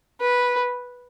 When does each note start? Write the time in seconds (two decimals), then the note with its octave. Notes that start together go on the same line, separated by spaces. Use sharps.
0.21 B4